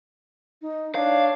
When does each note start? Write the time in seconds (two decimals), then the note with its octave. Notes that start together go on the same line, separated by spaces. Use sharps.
0.62 D#4
0.95 D4 C#5 F5